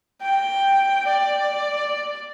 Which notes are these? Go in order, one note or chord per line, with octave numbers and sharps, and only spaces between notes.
G5
D5